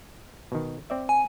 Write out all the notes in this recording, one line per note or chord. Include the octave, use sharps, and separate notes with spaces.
B2 D#3
C4 D5 E5
G#5